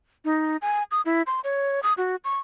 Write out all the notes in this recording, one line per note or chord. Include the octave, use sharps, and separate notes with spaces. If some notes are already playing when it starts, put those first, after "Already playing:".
D#4
G#5
D#6
E4
C6
C#5
D#6
F#4
C#6